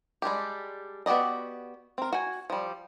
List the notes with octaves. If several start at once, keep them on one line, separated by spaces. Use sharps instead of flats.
G3 G#3 D4 G4
B3 F#4 G4 D5 D#5
C4 A#4
F#4 G#5
F3 G3